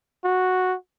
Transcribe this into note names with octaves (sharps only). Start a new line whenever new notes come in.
F#4